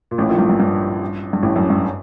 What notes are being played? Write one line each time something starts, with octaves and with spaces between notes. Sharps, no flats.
A#2
A1 A2
A#1 A#2
G2
G2
G2
G2
A1 A2
F#2
G2